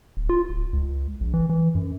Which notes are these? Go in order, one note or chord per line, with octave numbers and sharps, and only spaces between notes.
D1
F4
D1
C#2
A#1
E3
E3
F#2